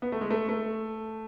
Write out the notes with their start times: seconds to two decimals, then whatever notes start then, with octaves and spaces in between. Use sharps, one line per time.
0.02 B3
0.12 A3
0.21 G#3
0.31 A3
0.49 A3